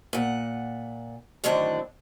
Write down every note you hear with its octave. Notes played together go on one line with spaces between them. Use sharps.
A#2 F#5
F#2 A2 D3 D#3 C4 D4